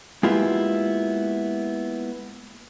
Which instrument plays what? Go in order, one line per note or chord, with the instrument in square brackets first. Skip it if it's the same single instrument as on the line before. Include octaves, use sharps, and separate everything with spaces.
[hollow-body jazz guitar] G#3 A#3 B3 E4 F4 G4